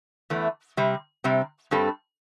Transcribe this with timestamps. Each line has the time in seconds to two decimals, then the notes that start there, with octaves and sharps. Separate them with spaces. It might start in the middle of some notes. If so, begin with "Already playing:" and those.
0.30 E2 E3 A3
0.77 C3 G3 C4
1.24 C3 G3 C4
1.71 G2 G3 C4 A4